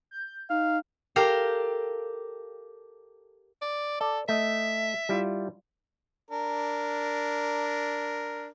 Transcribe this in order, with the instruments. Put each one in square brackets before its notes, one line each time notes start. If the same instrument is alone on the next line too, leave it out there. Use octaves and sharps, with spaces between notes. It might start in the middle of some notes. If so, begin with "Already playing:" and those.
[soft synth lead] G6
[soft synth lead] D#4 [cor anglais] F5
[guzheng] G4 A4 A#4 F5 G5
[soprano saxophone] D5
[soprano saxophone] A4 [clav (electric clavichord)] D5
[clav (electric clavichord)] A3 D#5 [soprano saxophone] E5
[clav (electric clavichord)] G3 E4 F4
[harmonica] D4 A#4